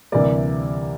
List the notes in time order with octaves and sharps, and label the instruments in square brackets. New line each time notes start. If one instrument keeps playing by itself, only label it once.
[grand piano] D2 C3 E3 G3 A#3 D5